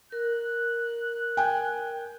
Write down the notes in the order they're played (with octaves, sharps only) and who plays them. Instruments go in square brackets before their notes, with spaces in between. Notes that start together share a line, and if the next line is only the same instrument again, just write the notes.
[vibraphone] A#4 [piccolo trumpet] F#6
[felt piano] G5 G#5